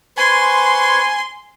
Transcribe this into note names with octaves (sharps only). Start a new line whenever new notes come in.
B4 C5 G#5 C6 C#6